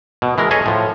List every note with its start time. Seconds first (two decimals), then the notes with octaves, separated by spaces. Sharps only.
0.22 B2
0.38 E3 G#3 A#4
0.51 G#4 A4 C#5 D#5 E5 G#5
0.66 A2 F3